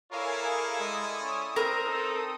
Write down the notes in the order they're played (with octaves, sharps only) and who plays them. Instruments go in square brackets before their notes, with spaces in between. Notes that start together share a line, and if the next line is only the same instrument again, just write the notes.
[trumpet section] E4 A4 D5 [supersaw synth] A#4 F5 G#5 [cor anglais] C#5
[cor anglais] G#4
[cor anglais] G#3 [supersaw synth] D#6
[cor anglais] C#4
[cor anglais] C4 [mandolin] A#4
[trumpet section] D#4 A4